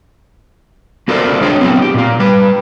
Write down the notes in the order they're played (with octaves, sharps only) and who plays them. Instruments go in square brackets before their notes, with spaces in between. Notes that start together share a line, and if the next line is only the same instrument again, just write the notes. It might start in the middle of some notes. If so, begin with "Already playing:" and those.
[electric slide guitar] A#3 F#4 A4 A#4 C5 D5
G#3 D4 G#4 C#5
F#3 B3 C4 E4
G4
A#2 A#3
G3 B4